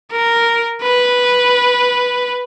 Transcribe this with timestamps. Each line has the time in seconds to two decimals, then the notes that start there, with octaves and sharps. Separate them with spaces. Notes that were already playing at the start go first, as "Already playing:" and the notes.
0.12 A#4
0.82 B4